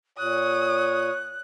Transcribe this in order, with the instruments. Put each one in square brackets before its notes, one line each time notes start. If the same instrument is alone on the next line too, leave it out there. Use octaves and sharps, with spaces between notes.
[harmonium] A#2 [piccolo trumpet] C#5 [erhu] D#6 [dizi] F#6